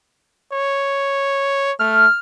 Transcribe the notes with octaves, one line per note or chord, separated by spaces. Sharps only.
C#5
A3 F6